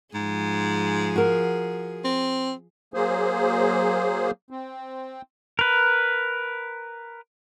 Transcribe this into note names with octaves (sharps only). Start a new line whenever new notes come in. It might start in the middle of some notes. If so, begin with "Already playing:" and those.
G#2 F3 G#4
F#4 A#4
C4
F#3 A#3 G#4 C5
C4
A#4 B4